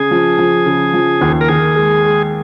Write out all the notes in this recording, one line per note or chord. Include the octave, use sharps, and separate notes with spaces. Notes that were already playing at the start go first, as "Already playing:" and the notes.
Already playing: C#3 G#4
F3
F3
C#3
F3
D#2
A#4
D#3 G#4
G#3
G#3